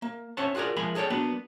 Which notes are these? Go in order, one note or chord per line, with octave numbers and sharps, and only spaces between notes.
A#3
C4 C#4 C#5 E5 F#5 A5
F4 F#4 G#4 A#4 D5
F3 G#3 A#4 E5 G#5 B5
G#4 A4 C#5 D5 G5
F#3 A#3 B3 D4 B4